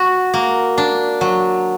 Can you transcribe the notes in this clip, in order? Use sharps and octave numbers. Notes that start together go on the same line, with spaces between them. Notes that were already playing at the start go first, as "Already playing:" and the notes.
Already playing: F#4
A#3
D4
F#3